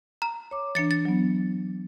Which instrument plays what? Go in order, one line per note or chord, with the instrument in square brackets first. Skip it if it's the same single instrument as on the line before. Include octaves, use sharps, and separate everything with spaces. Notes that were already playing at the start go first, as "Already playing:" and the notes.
[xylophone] A#5
[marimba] C#5 D6
[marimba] E3 D4 [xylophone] A6 C#7
[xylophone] A6
[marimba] F#3 B3